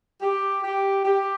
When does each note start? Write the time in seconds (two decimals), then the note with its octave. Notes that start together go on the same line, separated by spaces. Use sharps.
0.22 G4
0.63 G4
1.05 G4